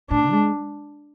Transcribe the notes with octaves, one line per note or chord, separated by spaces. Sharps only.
A2 D4
G#3